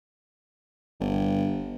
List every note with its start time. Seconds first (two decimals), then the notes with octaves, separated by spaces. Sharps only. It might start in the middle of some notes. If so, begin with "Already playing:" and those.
1.00 G1